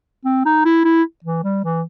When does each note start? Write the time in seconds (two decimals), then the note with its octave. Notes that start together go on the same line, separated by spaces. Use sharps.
0.25 C4
0.45 D#4
0.65 E4
0.84 E4
1.24 E3
1.44 G3
1.64 E3